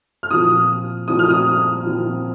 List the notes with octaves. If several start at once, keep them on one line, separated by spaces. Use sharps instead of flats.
F6
A#2 F3 C4 D#6
A#2 F3 C4 D#6
F6
D#6
A#2 F3 C4